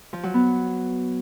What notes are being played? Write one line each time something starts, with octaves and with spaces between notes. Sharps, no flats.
F3
F#3
B3